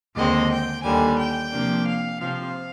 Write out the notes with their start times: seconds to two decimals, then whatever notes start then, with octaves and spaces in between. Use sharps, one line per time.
0.15 D#2 D3 G#3 C4 D#5
0.50 G5
0.83 D#2 D3 G3 G#5
1.19 G5
1.52 C3 F3 A#3 D4
1.87 F5
2.20 C3 F3 C4 F5